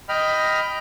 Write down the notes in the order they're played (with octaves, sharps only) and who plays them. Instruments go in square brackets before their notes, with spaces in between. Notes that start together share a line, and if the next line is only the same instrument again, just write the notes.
[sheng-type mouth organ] D#5 G5 B5 F6